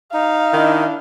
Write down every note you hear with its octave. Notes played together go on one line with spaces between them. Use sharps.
D#4 F5
D#3 D4 E4